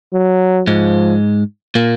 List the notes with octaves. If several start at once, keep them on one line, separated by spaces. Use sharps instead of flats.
F#3
G#2 F3 G#3
A#2 A#3